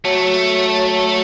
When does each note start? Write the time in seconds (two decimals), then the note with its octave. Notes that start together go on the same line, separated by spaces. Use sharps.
0.05 F#3 A3